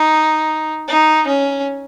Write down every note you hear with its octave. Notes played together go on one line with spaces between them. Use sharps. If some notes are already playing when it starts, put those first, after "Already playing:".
Already playing: D#4
D#4
C#4